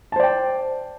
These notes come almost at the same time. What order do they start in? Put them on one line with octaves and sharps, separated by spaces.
A5 C5 D5 G5